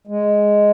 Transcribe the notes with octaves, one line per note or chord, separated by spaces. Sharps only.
G#3